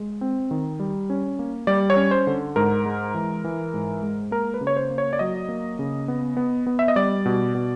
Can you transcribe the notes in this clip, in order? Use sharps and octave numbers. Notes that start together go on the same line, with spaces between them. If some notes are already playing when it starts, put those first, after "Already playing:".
Already playing: G#3
C4
D#3
G3
C#4
A#3
G3 D5
C#5
C#4
C5
D3
G#2 A#4
G#3
E3
E3
G#2
G#3
A#3 A#4
B4
C#3
C#5
C5
A#3
C#5
D5
F#3 D#5
A#3
C#3
B3
B3
B3
E5
D#5
G3 D5
B2
B2